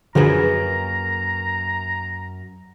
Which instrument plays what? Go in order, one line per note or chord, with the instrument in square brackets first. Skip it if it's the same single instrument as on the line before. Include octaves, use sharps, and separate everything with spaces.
[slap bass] F#2 [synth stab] D3 F3 F#3 [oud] A#3 G#4 B4 [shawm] A#5